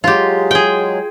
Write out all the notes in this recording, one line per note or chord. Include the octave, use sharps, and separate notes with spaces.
F#3 G#3 F4 G4
G#4 G5